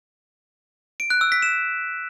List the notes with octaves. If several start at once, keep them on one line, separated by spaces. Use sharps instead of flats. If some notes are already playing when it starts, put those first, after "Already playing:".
D7
F#6
E6
B6
E7